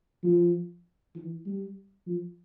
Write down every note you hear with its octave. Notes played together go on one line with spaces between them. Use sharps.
F3
E3
G3
F3